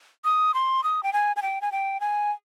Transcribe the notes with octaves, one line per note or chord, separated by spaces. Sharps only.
D#6
C6
D#6
G5
G#5
G#5
G5
G#5
G5
G#5